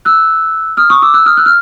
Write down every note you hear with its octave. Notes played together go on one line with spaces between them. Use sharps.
E6 F#6
D#6 F6
C#6 D#6
D6 E6
E6 F#6
D#6 F6
E6 F#6
F6